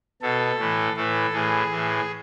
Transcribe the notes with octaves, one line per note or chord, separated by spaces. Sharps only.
B2 A4
A2 E3
A2 E3 A4
A2 E3 G#4
A2 E3